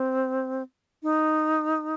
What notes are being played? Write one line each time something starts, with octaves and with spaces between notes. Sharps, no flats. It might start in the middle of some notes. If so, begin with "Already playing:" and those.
Already playing: C4
D#4